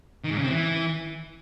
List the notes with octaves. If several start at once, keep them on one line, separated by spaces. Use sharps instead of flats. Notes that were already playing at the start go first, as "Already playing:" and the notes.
D#3
G#2
C#3
C4
E3